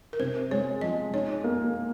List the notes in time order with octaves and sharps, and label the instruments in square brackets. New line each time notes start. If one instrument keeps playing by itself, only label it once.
[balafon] A#4
[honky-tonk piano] C3 [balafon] C5
[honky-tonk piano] G#3 [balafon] C#5
[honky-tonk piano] F3 [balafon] D#5
[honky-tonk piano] D#4 [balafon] C#5
[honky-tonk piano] A#3